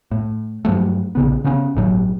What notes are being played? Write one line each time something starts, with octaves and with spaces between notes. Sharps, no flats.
A2
G2 F3 F#3 A3
A#1 C#3 B3
C#3 B3 C#4
G1 A2 D3 F#3